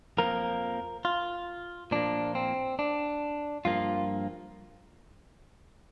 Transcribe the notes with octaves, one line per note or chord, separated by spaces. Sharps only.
F2 F3 A#3 A#4
F4
A#2 F3 A#3 D4
C4
D4
G2 F3 A#3 F4